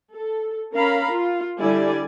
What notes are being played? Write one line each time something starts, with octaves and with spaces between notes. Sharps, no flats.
A4
C#4 A#4 F5 A#5 B5
F4
D3 G3 E4 A4 D5 G#5